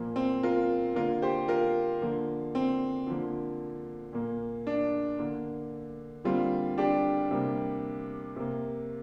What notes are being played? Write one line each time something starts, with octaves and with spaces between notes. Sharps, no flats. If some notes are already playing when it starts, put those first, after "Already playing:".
Already playing: A#2 F3 A#3
C4
F4 A#4
D3 A#3 F4 A#4
G4 C5
F4 A#4
D3 F3 A#3
C4
D3 F3 A#3
A#2 A#3
D4
D3 A#3
D3 G3 A#3 C4 F4
D4 G4
C3 G3 A#3
C3 A#3